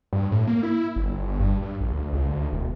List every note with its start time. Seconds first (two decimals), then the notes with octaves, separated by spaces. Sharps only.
0.13 G2
0.32 A2
0.47 A#3
0.63 E4
0.96 G1
1.40 G2
1.62 G2
1.80 A#1
1.92 D2
2.13 C#2
2.28 D2
2.53 E1